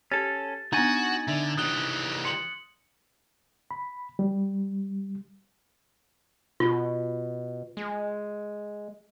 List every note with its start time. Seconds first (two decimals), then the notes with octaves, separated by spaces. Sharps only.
0.12 C#4 G4 A4 A6
0.73 B3 D4 D#4 F#4 G#5 G#6 A6
1.27 D3 D4 E5
1.57 E3 G3 D#6 F#6 G7
2.25 C6 C#7 F#7
3.71 B5
4.19 G3
6.60 B2 F4
7.77 G#3